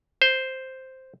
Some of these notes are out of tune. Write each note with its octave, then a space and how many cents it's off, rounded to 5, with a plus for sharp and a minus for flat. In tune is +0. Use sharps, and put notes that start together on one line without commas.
C5 +0